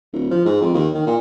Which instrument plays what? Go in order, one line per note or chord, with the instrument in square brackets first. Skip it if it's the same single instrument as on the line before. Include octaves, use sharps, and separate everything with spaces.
[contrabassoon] D1
F3
G#2
F2
D#2
D#3
A#2